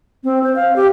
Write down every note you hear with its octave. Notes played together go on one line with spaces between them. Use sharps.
C4
C5
F5
G4